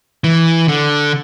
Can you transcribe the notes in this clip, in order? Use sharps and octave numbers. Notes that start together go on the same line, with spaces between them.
E3
D3